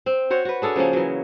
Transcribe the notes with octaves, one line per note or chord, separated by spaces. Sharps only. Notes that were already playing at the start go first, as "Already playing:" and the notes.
C4
F#4 C5 C#5
F#4 B4
D4 G#4 A4 C#5
C#3 F3 A#3 C#4
E3 F#3